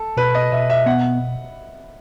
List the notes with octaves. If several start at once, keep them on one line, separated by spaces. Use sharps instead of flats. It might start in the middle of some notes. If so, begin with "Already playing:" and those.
Already playing: A4
B2 B4
D#5
B2 E5
E5
B3 F#5